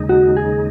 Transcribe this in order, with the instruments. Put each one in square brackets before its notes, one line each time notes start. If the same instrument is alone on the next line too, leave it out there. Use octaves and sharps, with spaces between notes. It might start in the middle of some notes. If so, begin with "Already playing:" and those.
Already playing: [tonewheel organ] D#2 C#3 G#3 D#4
[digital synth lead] F#4
G#4